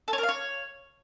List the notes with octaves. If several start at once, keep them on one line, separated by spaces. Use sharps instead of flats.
A4
C#5
A#4
F5
C#5